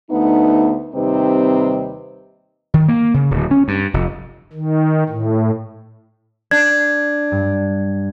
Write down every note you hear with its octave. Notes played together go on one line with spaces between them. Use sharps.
D2 A3 B3 D#4
D#2 C3 G3 C4 D#4 B4
D#3
A#3
C#3
D1
C#4
G2
F1
D#3
A2
D4 G#6
G2